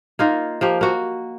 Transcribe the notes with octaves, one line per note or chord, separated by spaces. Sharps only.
A#3 D#4 F4
F3 A#3 G4
A#3 F#4